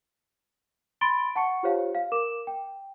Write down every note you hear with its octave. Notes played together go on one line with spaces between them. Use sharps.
B5 C6 A6 D7 G7
F#5 A5 C#6 C#7
F4 G4 C5 C#5 F5
F5
A#4 D6 E7
G5